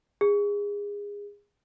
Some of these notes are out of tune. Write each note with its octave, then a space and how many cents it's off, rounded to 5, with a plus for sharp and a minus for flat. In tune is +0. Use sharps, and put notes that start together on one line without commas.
G#4 -25